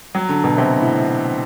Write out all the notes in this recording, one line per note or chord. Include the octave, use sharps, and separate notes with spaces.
F#3
D3
B2
C3
A2